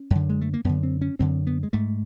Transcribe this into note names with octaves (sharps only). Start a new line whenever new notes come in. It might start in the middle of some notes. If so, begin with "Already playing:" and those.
Already playing: C#4
F#2 D3
G#3
A3
A#3
F#2 D3 B3
C4
C#4
F#2 D3 C4
B3
G#3
G#2 A3